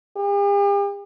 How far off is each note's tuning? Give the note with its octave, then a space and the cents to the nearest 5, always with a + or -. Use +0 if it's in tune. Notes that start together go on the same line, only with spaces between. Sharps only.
G4 +45